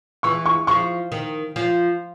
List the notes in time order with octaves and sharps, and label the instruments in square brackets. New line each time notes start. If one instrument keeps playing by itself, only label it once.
[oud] E3 [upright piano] C#6
[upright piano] C#6
[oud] F3 [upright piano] C#6
[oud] D#3
F3